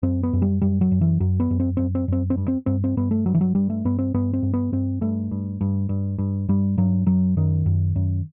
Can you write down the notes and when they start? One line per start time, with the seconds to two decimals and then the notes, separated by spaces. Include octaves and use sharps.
0.03 F#2 C4
0.23 B3
0.33 F#2
0.42 G3
0.62 F#2 G3
0.81 F#3
0.92 F#2
1.01 E3
1.20 F#2 F#3
1.40 B3
1.51 F#2
1.60 C4
1.77 F#2 C4
1.95 C4
2.08 F#2 C4
2.30 C4
2.37 G2
2.48 C4
2.66 G2 C4
2.84 C4
2.97 G2 B3
3.11 A3
3.26 G2 F#3
3.34 E3
3.41 F#3
3.55 G2 G3
3.70 A3
3.85 G2 B3
3.99 C4
4.14 G2 B3
4.33 C4
4.43 G2
4.54 B3
4.72 G2 C4
5.01 G2 A3
5.31 G2
5.61 G2
5.89 G2
6.18 G2
6.49 G2 G3
6.78 G2 F#3
7.06 F#2 F#3
7.37 F#2 D#3
7.66 F#2
7.96 F#2